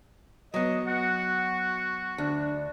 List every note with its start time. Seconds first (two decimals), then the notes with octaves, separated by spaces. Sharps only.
0.54 F#3 B3 D#5
0.87 F#4 F#5
2.18 D2 D4